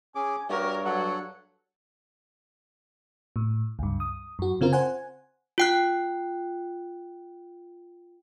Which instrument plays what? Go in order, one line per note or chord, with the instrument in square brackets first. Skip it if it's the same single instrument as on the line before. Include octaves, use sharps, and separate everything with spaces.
[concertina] C#4 G#4 D6 [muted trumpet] G#5
[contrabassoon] G2 [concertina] F#4 G4 [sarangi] A#4 [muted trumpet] C#5
[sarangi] F#3 [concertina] A4 F#5
[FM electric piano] A2
C#2 G2
D#6
F#2 F#4
C#3 C4 F4 A#4
C5 F#5 G#5
[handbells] F4 G5 F#6